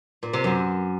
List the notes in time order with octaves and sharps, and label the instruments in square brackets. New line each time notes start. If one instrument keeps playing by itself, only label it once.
[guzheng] A#2
C3
F#2